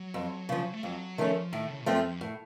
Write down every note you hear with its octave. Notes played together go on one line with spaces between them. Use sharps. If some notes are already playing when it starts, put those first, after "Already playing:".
Already playing: F#3
F2
C#3 F3
A3
F2 F#3
D#3 F3 A3 C#4
A2 D#3
C#3
F#2 F3 A3 C4 F4
F2
A2